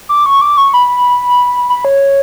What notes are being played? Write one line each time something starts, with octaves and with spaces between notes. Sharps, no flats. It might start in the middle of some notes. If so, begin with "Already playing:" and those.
D6
C#6
D6
C#6
B5
B5
C#5